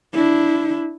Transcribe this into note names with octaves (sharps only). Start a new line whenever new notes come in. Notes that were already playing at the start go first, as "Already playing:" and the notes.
D4 E4